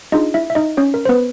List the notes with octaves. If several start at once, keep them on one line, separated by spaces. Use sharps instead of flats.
D4 D#4 F4 G#4 D#5
E4 E5
E5
D#4 D#5
C#4 C#5
A#4
C5
B3 B4